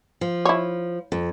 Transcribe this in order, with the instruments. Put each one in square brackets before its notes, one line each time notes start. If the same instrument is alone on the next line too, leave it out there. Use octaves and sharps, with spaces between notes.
[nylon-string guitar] F3
[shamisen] E4 C#5
[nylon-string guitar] F2